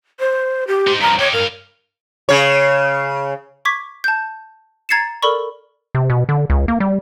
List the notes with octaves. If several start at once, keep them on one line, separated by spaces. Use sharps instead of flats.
C5
G4
D#4 C5
G2 F3 A#5
D#4 G4 C#5
G2 A#4 F5
C#3 C#5
C#6 D6 G#6 B6
A5 G6
A#5 G#6 A6 C7 C#7 E7
A4 A#4 D5 B5 C#6
C3
B2
D3
C#2
A#3
G3